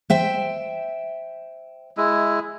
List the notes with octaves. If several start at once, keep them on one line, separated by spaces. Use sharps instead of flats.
C5 E5 G5
G#3 E4